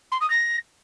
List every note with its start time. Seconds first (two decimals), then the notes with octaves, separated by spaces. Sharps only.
0.12 C6
0.21 D#6
0.30 A#6